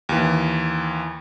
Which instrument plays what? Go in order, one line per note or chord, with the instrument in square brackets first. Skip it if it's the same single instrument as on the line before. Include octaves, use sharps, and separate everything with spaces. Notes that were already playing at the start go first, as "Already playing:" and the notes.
[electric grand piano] D#2 E3